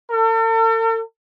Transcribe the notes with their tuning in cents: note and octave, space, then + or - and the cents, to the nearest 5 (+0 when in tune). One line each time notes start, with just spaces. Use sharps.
A4 +45